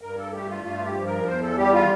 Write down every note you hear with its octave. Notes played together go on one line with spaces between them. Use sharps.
G2 A#4
A4
A3 G4
F4
G2 F4
G4
F3
A#4
E2 C5
A4
G3 G4
F4